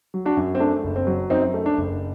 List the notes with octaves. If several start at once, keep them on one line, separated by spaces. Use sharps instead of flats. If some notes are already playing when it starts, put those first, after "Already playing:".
F#3
D4 F#4
F#2
C4
A3 D4
F#1
C4
F#3
F#2 C4 D#4
A3
D4
F#1